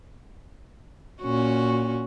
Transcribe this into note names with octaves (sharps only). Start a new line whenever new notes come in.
A#2 C#4 F#4